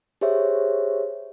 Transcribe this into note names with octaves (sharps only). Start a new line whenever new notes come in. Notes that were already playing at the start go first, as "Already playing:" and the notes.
G4 G#4 C5 C#5 E5